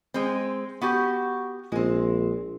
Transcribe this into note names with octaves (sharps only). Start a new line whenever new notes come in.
G#3 C4
B3 F#4 G4
A#1 G#3 C4